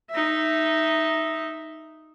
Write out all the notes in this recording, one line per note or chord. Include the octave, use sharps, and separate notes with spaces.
D#4 E5